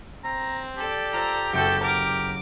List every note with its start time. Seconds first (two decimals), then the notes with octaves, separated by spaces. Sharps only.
0.24 C4 A#5
0.77 G4 A4 D5
1.13 F4 C5 A#5 E6
1.53 F#1 B3 F#4 A4 G5 C#7
1.83 A#4 D6